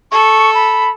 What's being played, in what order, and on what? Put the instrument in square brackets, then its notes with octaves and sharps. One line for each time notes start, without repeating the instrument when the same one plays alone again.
[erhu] A4 [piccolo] C#6
[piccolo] B5